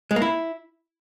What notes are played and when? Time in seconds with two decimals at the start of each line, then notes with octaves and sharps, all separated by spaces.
0.11 G#3
0.16 A#3
0.22 E4